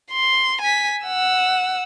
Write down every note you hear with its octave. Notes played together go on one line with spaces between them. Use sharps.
C6
G#5 B6
F#5 E6